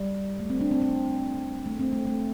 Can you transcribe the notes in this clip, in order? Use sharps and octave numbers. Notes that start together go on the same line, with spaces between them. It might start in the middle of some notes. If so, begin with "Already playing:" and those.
Already playing: G3
A3
C4
D4
C4
C4
A3
C4
A3
A3